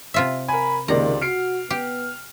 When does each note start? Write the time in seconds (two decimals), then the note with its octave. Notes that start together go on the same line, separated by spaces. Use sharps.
0.14 C3 F4 E5
0.48 A#4 G#5 B5
0.88 C#2 C3 D#3 A#3 D5 A#5
1.22 F#4 F6 C7 D7
1.71 B3 G4